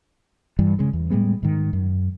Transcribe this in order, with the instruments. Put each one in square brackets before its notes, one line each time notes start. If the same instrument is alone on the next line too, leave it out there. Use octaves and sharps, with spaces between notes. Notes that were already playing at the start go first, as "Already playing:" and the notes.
[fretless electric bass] G2 E3 G3
C#3 G#3
E2
A2 G3 G#3 B3
G#2 D#3
F#2